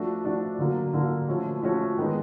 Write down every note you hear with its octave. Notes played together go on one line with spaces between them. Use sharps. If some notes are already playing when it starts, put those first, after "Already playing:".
Already playing: F3 A3 D4 F#4
F3 A3 D4 F#4
D3 F#3 A#3
D3 F#3 A#3
F3 A3 C#4 F#4
F3 A3 C#4 F#4
D#3 G#3 B3 D#4